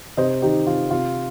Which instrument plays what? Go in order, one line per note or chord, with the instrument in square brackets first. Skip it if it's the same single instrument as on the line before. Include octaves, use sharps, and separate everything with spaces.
[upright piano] C3 C5 D#5
D#3 D#4 G4
C3 F4
C3 F4